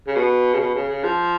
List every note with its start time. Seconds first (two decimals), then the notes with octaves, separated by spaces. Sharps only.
0.08 C#3
0.16 B2
0.54 C#3
0.60 B2
0.75 C#3
0.89 C#3
1.04 F3